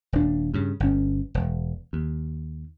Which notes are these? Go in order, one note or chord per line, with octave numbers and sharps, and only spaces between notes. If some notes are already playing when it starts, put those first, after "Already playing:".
D#1 D4
G2 C#3
G1 C#4
E1
D#2